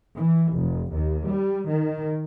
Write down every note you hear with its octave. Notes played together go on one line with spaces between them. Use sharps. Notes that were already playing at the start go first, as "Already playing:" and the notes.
E3
F1
D#2
G3
D#3